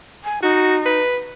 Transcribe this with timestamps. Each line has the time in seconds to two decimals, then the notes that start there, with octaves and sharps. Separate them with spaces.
0.24 G#5
0.42 D#4 F#4
0.86 B4